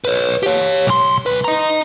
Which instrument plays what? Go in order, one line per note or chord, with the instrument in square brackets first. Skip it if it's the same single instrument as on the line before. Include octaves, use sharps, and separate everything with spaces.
[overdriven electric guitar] B4 C#5
G4 C#5
B1 C6
C2 B4
D#5 A#5